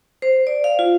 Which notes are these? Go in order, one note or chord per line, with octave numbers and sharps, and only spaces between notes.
C5
D5
F5
F4